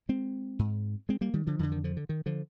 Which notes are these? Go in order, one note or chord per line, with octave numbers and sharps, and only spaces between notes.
G#3 C4
G#2
G#3 C4
G3 A#3
D#3 G3
D3 F3
F2 D3 D#3
D#3
D3 F3
D3
D#3
D3 F3